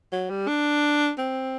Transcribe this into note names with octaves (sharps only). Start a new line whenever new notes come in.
F#3
G3
D4
C4